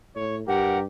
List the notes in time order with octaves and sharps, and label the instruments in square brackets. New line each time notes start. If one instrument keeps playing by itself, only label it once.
[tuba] A2 [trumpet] C#5
[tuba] G2 [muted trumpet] G4 [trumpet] A#4 [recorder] F#5